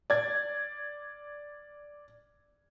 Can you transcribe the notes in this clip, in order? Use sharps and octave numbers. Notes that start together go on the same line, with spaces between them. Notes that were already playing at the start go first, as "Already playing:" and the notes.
D5 G#6